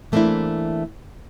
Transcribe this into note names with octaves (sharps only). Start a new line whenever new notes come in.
E3 A3 A#3 C4 D4 E4